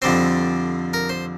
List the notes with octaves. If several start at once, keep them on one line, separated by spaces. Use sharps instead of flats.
F2 D3 G3 C4 C5
A#4
C5